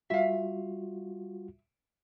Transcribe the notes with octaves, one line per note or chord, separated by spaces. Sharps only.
G3 F4 F#4 E5 F5